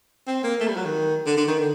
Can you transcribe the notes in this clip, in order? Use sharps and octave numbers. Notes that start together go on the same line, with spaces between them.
C4
A#3
A3
G3
F#3
D#3
D3
D3
D#3
D3